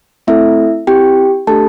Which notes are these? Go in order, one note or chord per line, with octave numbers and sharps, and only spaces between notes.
A3 C4 E4 A4 E5
C4 E4 G4 G5
A3 D4 G4 A4 A5